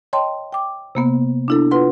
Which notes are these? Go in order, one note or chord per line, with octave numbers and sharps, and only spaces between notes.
C#5 D#5 G5 A5 C6
G5 D6
C3 A#3 B3
D4 E4 A4
F4 B4 F#5 C6